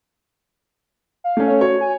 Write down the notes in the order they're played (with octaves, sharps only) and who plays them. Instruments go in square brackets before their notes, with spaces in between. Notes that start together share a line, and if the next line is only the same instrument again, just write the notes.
[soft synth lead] F5
[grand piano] A3 C#4
[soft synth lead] C#5
[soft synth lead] F#4 [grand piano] C#5
[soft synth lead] G#5